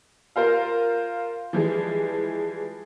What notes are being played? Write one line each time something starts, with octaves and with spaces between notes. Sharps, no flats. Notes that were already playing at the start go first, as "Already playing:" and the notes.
F4 A#4 C5 F5
E3 F3 G3 G#3